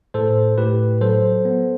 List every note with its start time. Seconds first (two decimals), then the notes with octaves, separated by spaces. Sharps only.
0.14 A2 A4 C5
0.58 A2 G4 B4
1.01 F#3 A4 C5
1.45 B3